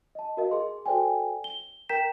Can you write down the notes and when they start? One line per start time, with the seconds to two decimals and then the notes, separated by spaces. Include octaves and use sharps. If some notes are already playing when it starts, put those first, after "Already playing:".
0.15 D#5 A5
0.37 F#4 A#4 D#5 F5
0.51 G#4 C6
0.86 F#4 A4 C5 D5 G5 G#5
1.44 G7
1.89 A#4 G5 A#5 G6 B6 E7